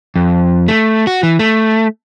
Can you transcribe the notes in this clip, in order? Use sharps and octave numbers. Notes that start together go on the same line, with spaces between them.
F2
A3
F#4
E3
A3